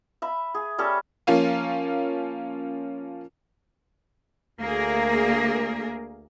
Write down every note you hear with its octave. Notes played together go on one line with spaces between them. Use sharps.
E5 B5
G#4
G3 C#4 A4
F3 A#3 C#4 F4
D2 A#3 G#4 A#4